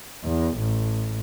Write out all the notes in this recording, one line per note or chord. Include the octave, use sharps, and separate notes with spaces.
E2
A1